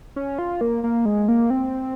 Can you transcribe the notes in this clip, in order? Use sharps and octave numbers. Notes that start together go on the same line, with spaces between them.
C#4
F4
A#3
A#3
G#3
A#3
C4